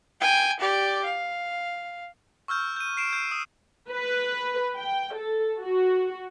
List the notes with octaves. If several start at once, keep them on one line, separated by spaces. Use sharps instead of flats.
G5 G#5
G4 D5
F5
C#6 E6 F6 G6
G6 D#7
C7 D7 E7
G6 C7
D#6
B4
G5
A4
F#4